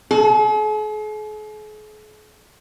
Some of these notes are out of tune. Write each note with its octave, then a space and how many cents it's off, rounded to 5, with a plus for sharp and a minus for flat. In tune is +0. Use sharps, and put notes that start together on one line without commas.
G#4 +45